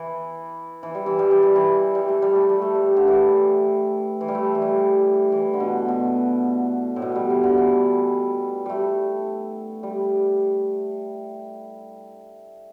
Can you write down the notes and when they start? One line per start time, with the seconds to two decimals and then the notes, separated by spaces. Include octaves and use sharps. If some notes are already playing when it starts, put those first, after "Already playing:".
Already playing: E3
0.83 E3
0.95 G3
1.06 E3
1.19 G3
1.31 E3
1.43 G3
1.56 E3
1.95 G3
2.08 A3
2.22 G3
2.36 A3
2.49 G3
2.62 A3
2.75 G3
2.97 D3
3.08 E3
4.21 E3
4.28 G3
4.35 A3
4.55 E3
4.62 G3
5.32 E3
5.54 D3
5.60 B2
5.88 B2
6.96 A2
7.02 B2
7.16 G3
7.30 E3
7.43 D3
7.57 E3
8.66 G3 A3
9.83 G3